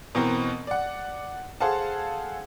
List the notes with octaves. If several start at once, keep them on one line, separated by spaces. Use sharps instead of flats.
B2 E3 B3 C4 A#4
D5 F#5
G#4 A4 C5 F5 F#5 A5